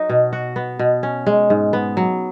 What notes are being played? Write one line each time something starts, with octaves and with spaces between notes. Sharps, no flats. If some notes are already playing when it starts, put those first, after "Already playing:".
Already playing: F#3 D#4 F#4
B2
F#4
B3
B2
C#4
G#3
G#2
B3
F#3